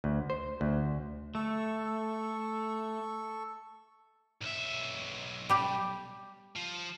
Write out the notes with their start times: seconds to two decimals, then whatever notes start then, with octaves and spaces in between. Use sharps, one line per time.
0.04 D2
0.30 C5
0.61 D2
1.35 A3 A4 C#6
4.41 B1 E5
5.50 G3 G4
6.56 F3